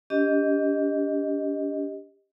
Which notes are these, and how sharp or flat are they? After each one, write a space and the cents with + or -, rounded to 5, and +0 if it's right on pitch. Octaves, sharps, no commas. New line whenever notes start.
D4 -40 G4 +10 D#5 +0